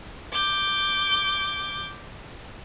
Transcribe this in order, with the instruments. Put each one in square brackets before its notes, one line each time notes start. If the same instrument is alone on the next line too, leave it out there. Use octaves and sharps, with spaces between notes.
[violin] D6 G6